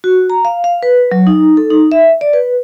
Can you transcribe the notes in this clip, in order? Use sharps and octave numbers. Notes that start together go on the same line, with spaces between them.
F#4
A#5
F5
F5
B4
F#3
D#4
A4
D#4
E5
D5
B4